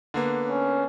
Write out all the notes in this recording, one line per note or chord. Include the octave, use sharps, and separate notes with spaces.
D3 A#3 B3
C#4